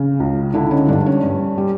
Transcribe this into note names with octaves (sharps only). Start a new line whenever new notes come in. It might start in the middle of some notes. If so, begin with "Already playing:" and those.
Already playing: C#3 C#4
C#2
D3 D4 E4
C#4 D#4
G2 D4
C#4
G2
G3